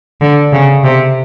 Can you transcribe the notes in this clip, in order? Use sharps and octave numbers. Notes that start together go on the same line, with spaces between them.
D3
C#3
C3